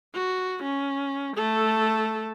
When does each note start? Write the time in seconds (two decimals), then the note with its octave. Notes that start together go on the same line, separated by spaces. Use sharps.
0.15 F#4
0.63 C#4
1.37 A3 A4